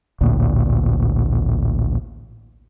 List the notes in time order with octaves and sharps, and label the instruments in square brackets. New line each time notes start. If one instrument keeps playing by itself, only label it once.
[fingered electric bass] A1 D2 A#2